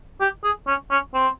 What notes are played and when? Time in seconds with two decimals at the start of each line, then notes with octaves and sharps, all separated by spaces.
0.21 G4
0.44 G#4
0.67 C#4
0.91 C#4
1.14 C4